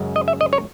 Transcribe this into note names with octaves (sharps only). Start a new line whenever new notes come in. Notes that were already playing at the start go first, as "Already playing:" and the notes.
Already playing: F#2 C#3 G#3
D#5
E5
D#5
C#5